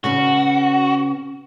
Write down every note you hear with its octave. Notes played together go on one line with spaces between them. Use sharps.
C#3 C#4 F#4 B4